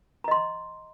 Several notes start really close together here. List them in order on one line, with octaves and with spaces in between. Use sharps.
A#5 D#5 C6